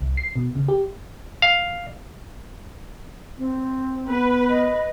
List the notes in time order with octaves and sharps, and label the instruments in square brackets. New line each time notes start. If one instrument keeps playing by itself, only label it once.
[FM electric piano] C2
C7
B2
C#3
G4
[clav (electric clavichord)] F5
[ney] C4
[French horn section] B3 [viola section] B4
[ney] D#5